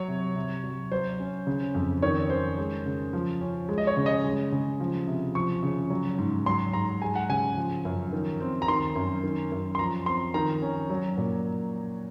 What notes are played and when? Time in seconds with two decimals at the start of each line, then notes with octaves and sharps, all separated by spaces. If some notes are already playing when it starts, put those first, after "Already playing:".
Already playing: F#3 C#5
0.08 C3
0.36 C3
0.64 F#3
0.92 F#3 C5
1.20 C#4
1.47 C#3
1.75 F2
2.02 D#3 C#5
2.30 C#4 C5
2.58 G#3
2.86 C#3
3.13 F3
3.41 C#4
3.69 G#3
3.78 D#5
3.87 C#5
3.97 C#3
4.06 D#5
4.24 G#3
4.52 C#3
4.80 F3
5.07 C3
5.35 F3 C#6
5.63 C#3
5.90 F#3
6.18 G#2
6.46 F#3 C6
6.73 G#2 A#5
7.02 G#3 G#5
7.15 F#5
7.29 C#3 G#5
7.57 F3
7.85 F#2
8.13 D#3
8.40 C4
8.62 A#5
8.68 D#3 C6
8.95 F#2
9.24 D#3
9.52 F#2
9.75 C6
9.79 F3 A#5
10.06 C4 C6
10.34 D#3 A#5
10.62 C#4
10.90 F#3
11.17 A#2